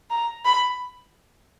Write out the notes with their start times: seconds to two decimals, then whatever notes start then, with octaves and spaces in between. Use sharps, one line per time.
0.10 A#5
0.45 B5